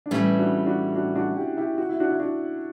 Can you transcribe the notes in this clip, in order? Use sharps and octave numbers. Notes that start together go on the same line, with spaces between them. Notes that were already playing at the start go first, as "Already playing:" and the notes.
D4
A2 E3 G3 A3 C#4
D4 F#4
D4 F#4
D4 F#4
D4 F#4
E4 G4
E4 G4
F#4
E4
D4 F#4
E4
D4 F#4